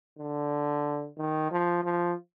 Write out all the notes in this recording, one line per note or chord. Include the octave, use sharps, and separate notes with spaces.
D3
D#3
F3
F3